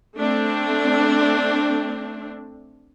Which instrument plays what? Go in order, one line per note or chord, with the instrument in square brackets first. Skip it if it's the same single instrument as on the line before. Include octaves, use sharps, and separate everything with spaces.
[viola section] A3 C4 D4